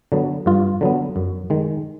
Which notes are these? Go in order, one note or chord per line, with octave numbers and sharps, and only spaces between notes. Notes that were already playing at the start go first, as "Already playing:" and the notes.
D3 F#3 B3
G2 F4
D3 F#3 B3
F#2
D#3 G#3